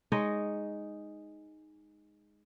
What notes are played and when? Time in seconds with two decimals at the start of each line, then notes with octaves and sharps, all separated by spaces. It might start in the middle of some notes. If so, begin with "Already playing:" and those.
0.12 G#3 D#4 C#5 D#5